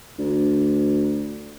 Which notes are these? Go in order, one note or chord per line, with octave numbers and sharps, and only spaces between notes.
D2